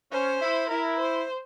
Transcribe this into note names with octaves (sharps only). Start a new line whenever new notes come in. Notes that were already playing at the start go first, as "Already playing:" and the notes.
C#4 C5
E4
E4 A#4
C5